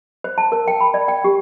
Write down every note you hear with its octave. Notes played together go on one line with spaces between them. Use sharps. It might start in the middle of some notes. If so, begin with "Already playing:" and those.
C5
A5
A#4
G5
B5
D5
G5
G4